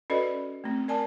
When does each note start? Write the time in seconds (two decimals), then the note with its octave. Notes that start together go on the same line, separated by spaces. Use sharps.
0.10 C#4 F#4 A4 B4 D5 D#5
0.64 A3 C4
0.88 A#4 D5 G#5 A5